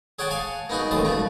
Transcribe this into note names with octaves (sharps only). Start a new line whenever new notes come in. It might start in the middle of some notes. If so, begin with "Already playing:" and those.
G#4 C#5 F#5 G5 A5
C#5 F5 G#5 A5
A#3 B3 D#4 F#4 G#4
A1 F#2 D#3 A3 A5 D#6
B2 G3 A3 F4